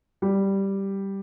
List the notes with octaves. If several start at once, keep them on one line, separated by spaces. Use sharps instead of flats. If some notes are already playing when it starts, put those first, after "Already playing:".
G3